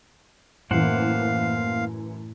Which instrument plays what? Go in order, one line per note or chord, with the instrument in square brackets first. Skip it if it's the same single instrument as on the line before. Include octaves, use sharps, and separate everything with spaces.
[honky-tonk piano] F#2 E3 [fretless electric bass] A2 [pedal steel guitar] A#3 C5 F#5 [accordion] F5